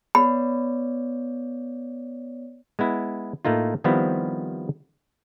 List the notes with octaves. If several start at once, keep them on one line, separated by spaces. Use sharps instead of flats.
B3 C#5 D5 B5
G#3 B3 E4
A2 A3 A#3 D#4 F4
D#3 F3 G3 B3 C4 E4